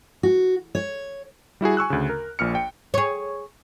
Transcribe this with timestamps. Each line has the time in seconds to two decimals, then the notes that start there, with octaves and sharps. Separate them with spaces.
0.23 F#4
0.75 C#5
1.61 G3 E4 F#4 G#4
1.77 G#5 C#6 E6 F#6
1.90 D2 C#3
2.09 A#4
2.39 A#1 A#2 F6 C#7
2.55 G5
2.94 G#4 C#5